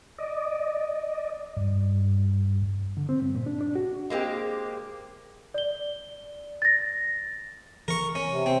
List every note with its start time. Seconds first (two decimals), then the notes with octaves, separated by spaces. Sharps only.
0.18 D5 D#5
1.56 G2
2.97 D3
3.09 C4
3.22 G2
3.35 A#2
3.46 D4
3.61 D4
3.75 F#4
4.10 G#3 A#3 C4 G4
5.54 D5 G7
6.62 A6 A#6
7.88 E3 A#4 C#6
8.15 C#4
8.30 C3
8.46 C4